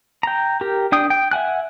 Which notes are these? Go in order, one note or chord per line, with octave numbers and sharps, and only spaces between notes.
G5 A#5
G4 A#4
D4 G5 D#6
G5
E5 F#5 G#5 F#6